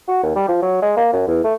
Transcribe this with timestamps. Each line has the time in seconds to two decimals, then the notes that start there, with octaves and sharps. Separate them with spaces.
0.08 F#4
0.23 D#2
0.36 G3
0.49 F3
0.62 F#3
0.82 G#3
0.97 A#3
1.13 F#2
1.27 E2
1.44 A3